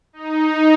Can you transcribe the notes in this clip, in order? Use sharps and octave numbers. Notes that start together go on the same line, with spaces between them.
D#4